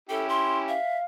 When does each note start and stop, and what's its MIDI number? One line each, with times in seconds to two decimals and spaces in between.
0.09 0.75 61
0.09 0.75 64
0.09 0.75 67
0.09 0.28 69
0.29 0.58 84
0.68 0.98 76
0.68 1.04 77